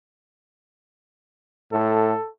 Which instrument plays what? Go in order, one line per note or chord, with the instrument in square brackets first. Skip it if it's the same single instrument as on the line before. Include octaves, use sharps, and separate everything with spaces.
[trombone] A2 [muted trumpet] A4